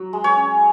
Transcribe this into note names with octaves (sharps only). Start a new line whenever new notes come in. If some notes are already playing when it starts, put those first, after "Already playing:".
Already playing: F#3
G#3
C#5
C#4